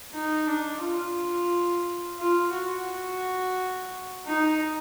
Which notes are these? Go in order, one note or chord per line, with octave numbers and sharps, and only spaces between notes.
D#4
D4
F4
F4
F#4
D#4